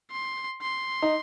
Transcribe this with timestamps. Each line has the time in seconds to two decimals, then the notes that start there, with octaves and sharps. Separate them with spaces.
0.11 C6
0.61 C6
1.02 D#4